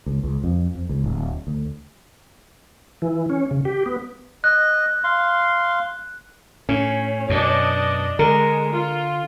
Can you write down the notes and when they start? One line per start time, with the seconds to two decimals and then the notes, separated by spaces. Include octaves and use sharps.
0.06 C#2
0.23 C#2
0.44 F2
0.75 F2
0.89 C#2
1.04 D1
1.47 D2
3.02 E3
3.30 C#4
3.51 C#3
3.65 G4
3.86 B3
4.44 D#5 F#6
5.04 F5 C6
6.69 A2 C#4
7.30 F#2 B2 D4 D#5
8.19 D3 G#3 A#4
8.71 F4